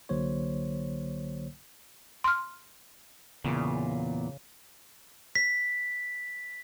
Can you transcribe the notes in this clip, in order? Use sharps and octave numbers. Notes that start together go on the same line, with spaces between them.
C2 D3 F#3 A#3 C5 C#5
C6 F6
E2 A#2 C#3
B6